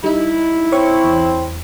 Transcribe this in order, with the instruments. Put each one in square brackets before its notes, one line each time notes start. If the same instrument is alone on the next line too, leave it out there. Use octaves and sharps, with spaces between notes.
[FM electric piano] G3 D#4 [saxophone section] E4
[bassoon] C4 [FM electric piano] C#5 B5 C#6
[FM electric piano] E2